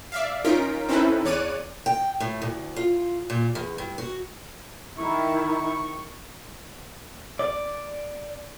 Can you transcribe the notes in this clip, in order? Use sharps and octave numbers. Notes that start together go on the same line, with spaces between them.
D5 E5 F5
C#4 D#4 F4 A#4 B6 D7
C4 C#4 D#4 E4 A4 B4
E2 C#5 D5 F#6 D#7
G5
A2
D2
F4
A#2
E2
G2
F#4
D#3 E4 C#6
D5